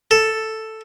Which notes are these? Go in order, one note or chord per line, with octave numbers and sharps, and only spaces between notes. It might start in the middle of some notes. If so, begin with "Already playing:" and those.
A4